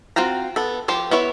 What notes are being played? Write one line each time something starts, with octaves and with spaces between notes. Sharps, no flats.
C4 F4 F#4 G5 A#5
B3 A4
F3 G4 C5
B3 E4 C#5 E5